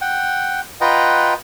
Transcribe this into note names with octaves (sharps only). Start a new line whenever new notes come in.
F#5 G5
F4 B4 D#5 F#5 G5 A#5